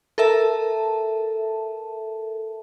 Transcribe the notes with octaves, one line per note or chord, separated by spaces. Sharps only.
A4 A#4 E5 A5